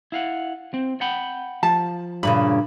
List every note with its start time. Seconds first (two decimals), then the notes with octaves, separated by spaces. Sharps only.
0.12 E4 F5 F#5
0.74 C4
1.01 F#5 G5 B5
1.63 F3 A5
2.23 G2 A#2 C#3 B5